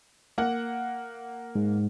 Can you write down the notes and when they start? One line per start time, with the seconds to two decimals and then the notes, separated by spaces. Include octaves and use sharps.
0.38 A#3 F#5
1.55 G#2